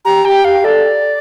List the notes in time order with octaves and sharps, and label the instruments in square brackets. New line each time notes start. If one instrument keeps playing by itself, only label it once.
[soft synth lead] G4 [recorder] A#5
[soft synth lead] G4 [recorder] G5
[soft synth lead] G4 [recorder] F5
[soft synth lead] G4
[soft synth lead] A4 [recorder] D5